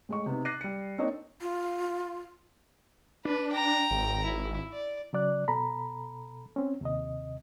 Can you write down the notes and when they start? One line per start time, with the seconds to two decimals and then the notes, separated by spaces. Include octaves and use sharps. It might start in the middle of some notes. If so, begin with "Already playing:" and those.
0.09 A2 G#3 D#5 C#6
0.26 C3 B3 D#4
0.45 D6 F#6 A6 A#6 C7 D#7
0.61 G3 C#7
0.98 A#3 C4 D4 D#4 C#5 D#5
1.41 F4
3.25 D4 B4
3.54 G5 A#5
3.91 G#1
4.24 E4
4.72 D5
5.13 C#3 F#3 D5 F#6
5.48 B2 A4 A#5 B5
6.56 C4 C#4
6.81 D#2 C3 D#5